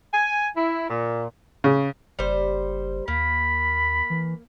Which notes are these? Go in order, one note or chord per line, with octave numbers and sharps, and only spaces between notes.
G#5
E4
A#2
C#3
F#1 G3 C5
D#2 A#3 B5
E3